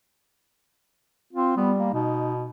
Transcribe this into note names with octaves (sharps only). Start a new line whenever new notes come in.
C4 F4
G3 B3
A#3
B2 D#4